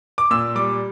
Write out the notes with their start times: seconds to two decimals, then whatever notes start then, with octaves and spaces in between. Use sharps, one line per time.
0.18 D6
0.31 A#2 E6
0.55 G3 D6